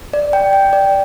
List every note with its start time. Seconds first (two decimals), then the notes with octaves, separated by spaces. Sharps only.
0.13 D5
0.33 G5
0.53 G5
0.73 D5